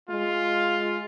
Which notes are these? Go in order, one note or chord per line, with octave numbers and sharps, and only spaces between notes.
G#3 F4